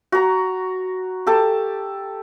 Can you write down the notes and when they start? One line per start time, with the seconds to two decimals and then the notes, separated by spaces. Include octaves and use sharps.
0.12 F#4 A#5
1.27 G4 A4 A5